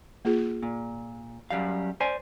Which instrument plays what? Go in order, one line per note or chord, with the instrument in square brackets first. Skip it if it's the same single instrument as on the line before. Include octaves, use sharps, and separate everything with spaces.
[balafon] A#3 F4 G#4
[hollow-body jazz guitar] A#2
F#2 G3 F5
C5 D5 G#5